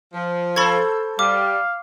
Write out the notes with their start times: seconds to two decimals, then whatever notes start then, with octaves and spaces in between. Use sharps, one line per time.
0.14 F3
0.56 A4 C5 B5 C#6 G#6
1.19 G3 F5 D6